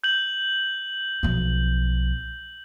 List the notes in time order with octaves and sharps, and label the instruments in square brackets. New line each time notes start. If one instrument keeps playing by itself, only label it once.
[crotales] G6 F#7
[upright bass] B1 F3